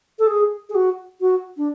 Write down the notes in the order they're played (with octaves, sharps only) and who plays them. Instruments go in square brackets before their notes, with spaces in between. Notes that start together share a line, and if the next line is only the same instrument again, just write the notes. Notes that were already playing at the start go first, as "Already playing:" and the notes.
[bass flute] A4
G#4
G#4
F#4
F#4
D4